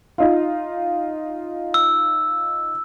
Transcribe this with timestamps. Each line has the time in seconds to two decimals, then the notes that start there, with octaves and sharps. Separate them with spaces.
0.18 D#4 F4
1.74 E6